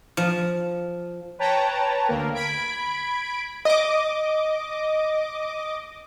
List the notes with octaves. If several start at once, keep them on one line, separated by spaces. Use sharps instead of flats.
F3
B4 C#5 G5 A5 A#5
D2 A#3 A#4
B5 G#6 B6 D7
D#5 D6